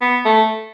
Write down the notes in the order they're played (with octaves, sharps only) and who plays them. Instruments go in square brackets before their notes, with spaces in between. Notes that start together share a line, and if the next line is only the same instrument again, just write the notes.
[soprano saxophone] B3
A3